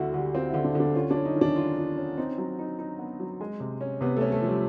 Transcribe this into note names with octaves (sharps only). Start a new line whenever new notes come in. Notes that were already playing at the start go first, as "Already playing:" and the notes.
Already playing: D2 D3 E4 F#4
D3 G4
C4 F4
D3 E4
D4
D3 D4
C#4 F4
D4
C#4
D#4
D#3
D4
F4
F4
C#4
C4 D#4
F#3
D#4
D#4
B3
F#3
G#3
C3
C#4
C3 B3
A3 C#4
A3
F3
G3